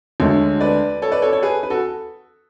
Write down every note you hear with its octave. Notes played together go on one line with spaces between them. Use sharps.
D2 D3 G#3 A4 C#5
B4 D5
A4 C#5
B4 D5
A4 C#5
A4 C#5
G#4 B4
B4
F#4 A4